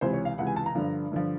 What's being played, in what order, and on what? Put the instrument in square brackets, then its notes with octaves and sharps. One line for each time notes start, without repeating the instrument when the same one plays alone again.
[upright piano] C#2 C3 E3 C5
C#5
F5
C#2 C3 E3 F#5
G#5
A5
A#5
G2 D3 F3
G2 D3 F3